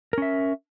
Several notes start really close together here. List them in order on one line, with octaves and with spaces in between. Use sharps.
A#4 C#4 E5